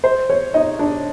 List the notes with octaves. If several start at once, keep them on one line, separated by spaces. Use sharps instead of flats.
C5
C#5
D#4 D#5
D4 D5